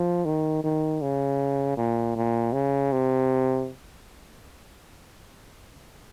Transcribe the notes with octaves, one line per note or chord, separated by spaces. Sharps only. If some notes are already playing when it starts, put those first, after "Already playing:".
Already playing: F3
D#3
D#3
C#3
A#2
A#2
C#3
C3